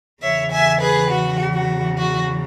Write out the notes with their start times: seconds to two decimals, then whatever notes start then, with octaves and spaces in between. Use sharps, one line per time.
0.22 E2 C#3 E3 C#5 E5
0.52 E5 G#5
0.81 G#4 B4
1.11 F#4
1.54 F#4
1.98 F#4